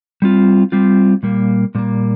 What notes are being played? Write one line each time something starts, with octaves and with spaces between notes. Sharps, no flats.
G3 C4 F4
G3 C4 F4
A#2 G3 A#3
A#2 G3 A#3